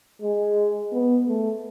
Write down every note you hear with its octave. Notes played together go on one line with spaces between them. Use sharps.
G#3
B3
A3